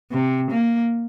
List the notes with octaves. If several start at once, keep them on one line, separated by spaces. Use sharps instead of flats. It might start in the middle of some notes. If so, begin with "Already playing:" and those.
C3
A#3